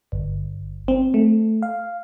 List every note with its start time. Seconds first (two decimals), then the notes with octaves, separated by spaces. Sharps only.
0.12 G1
0.88 C4
1.14 A3
1.63 F5